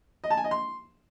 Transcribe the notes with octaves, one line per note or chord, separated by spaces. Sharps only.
D#5
A5
G#5
D#5
C6